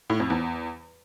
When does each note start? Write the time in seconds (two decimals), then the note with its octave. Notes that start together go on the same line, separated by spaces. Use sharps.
0.10 A2
0.20 F2
0.30 E2